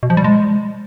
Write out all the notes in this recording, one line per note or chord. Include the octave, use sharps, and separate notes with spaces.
B2
F3
G3
G#3